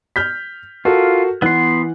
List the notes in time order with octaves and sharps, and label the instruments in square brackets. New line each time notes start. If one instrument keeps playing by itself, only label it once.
[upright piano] F6 G6 B6
[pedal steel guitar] F4 [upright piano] F#4 A4 A#4
[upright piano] E3 F#5 F#6 [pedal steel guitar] B3 C6